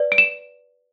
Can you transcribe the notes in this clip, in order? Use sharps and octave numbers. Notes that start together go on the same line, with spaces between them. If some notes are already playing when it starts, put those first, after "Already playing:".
Already playing: B4 D5
D7
E7